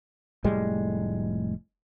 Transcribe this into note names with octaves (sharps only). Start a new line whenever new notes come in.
F1 A2 G3 G#3